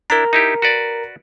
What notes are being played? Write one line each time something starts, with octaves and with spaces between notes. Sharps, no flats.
D4 E4 A#4 A#5
D#4 E4 G4
F#4 B4 D5